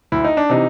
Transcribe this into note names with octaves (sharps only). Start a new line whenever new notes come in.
D2 E4
D#4
D4
C3 E3 D#4